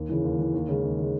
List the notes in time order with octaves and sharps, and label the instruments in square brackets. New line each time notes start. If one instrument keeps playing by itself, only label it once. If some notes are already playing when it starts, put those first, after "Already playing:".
Already playing: [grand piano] D#2
C#3 E3
D#2
C#3 E3
D#2
C#3 G#3
D#2
C#3 G#3